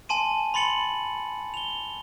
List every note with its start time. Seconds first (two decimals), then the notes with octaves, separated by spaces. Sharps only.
0.09 G#5 A5 C6 D#7
0.54 B5 C6 A6 C#7 F#7
1.54 F7 G7